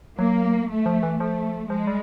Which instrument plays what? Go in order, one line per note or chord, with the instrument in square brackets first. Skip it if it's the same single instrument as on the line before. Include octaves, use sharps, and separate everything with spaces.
[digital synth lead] F#3 [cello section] A#3
[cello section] A3
[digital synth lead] F3
E3
[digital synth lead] F3 [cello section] A3
[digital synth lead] F3 [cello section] G#3
[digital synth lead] G3